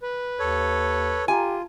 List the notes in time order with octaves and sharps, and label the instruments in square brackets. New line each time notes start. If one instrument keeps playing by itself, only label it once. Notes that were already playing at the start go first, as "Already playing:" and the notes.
[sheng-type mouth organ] B4
[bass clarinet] D#2 [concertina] A4 C#5
[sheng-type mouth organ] F4 [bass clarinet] G4 [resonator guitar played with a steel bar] G#5